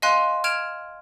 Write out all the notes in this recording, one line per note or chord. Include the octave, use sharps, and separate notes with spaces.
D#5 F5 G#5 C6 F#6
F6 G#6 D7 E7 F7